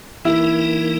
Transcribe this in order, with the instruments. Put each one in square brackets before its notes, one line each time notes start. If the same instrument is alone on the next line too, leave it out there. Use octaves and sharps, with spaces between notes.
[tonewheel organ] E3 A#3 D#4 A#4 [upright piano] E4